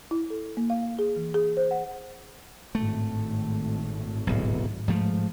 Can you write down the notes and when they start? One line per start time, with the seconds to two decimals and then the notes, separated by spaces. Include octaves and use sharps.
0.11 E4
0.30 A4
0.57 A#3
0.70 F5
0.99 G#4
1.16 E3
1.34 G#4
1.57 C5
1.71 F#5
2.75 G#1 A2 A3
4.27 D1 B1
4.88 G#2 F3 A3